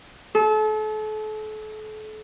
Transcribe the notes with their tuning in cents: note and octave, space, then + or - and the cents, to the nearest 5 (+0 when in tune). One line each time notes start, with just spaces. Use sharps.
A4 -35